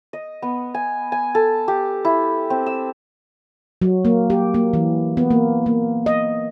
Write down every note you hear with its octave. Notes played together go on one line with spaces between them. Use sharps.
D#5
B3
G#5
G#5
A4
G4
E4
C4
E6
F#3
A#3
G4
A#3
E3
B3
A#3
A#3
D#5